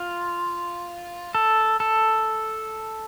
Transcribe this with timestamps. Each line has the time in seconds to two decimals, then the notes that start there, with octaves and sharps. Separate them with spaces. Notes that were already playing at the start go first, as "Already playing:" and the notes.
Already playing: F4
1.35 A4
1.80 A4